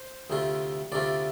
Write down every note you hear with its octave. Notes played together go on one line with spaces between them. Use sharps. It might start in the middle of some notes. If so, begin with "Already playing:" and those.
Already playing: C5
D2 C3 A3 F4
D2 C3 A3 F4 D5